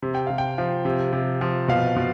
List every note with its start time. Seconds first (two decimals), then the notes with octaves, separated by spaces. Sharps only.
0.02 C3
0.15 G5
0.27 C3 F5
0.38 G5
0.58 F3
0.85 C3
1.13 C3
1.41 F3
1.68 B2 F5
1.96 B2